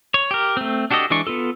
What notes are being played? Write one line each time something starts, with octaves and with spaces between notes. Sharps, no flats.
C#5
G4 A#4
A3 C4
D4 F#4 G4 A4 D#5
E3 G#3 D4 D5 C#6
B3 F4 A4